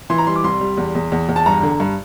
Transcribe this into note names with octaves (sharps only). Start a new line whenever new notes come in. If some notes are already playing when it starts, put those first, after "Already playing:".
E3 C6
A#5
G3 C6
D6
C2 C6
G3
E2
E2
E2
E2
A5
G2 A#5
D3
G2